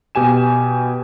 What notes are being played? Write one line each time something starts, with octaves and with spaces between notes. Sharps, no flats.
B2 G4 G#5 E7